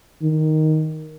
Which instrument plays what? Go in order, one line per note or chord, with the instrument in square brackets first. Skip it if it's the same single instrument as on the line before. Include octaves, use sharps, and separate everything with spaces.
[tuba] D#3